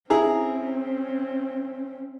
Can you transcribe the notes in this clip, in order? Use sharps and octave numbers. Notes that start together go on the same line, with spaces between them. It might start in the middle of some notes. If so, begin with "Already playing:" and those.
C4 C#4 E4 G#4 A#5